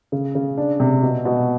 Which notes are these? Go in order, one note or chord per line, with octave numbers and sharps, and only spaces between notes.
C#3
C#3
D4
C3
B2
B2